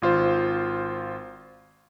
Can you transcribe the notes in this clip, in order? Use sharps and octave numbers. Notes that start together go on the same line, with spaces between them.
G#1 F4 C5